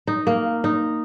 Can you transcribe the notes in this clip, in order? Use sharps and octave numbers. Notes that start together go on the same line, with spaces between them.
D#4
A#3
D#4